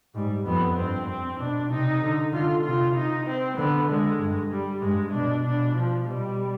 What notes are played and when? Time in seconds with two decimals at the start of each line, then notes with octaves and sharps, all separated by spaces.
0.15 G#2 G3
0.46 F2 B3
0.76 G2 C4
1.08 C4
1.39 B2 D4
1.70 C3 D#4
2.02 D3
2.33 D3 F4
2.64 C3 F4
2.96 D#4
3.26 C4
3.57 D3 B3
3.89 D3 G#3
4.20 G2
4.52 G3
4.82 G2 G#3
5.13 B2 D4
5.45 B2 D4
5.76 F3
6.07 B2 G3